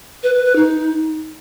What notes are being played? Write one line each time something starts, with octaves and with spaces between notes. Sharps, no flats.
B4
B4
B4
D#4